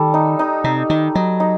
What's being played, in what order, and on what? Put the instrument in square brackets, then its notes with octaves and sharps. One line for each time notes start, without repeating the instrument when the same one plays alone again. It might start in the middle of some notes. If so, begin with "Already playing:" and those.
Already playing: [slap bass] D#3 [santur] G3 A4
[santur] D#4
D#4
[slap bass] C3 [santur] D#4
[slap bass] D#3 [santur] D#4
[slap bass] F#3 [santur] D#4
[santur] D#4